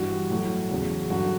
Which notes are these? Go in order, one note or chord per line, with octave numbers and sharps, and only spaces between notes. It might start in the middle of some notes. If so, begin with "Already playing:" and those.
Already playing: G2 E3 G3 F#4
A2 F#3
E2 C#3 F#3
G2 D3 F#3 F#4